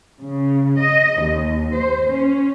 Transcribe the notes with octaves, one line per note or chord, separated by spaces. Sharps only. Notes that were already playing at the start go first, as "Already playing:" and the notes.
C#3
D#5
D#2
C5
C#4